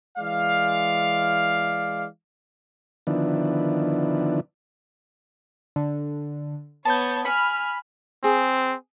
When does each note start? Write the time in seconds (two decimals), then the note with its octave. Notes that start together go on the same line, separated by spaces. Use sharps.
0.18 E3 G#3 D5 F5
3.07 D3 D#3 F3 B3 D4 E4
5.76 D3
6.85 B3 C#5 A5 G6
7.25 G#5 B5 F6
8.24 C4 G#4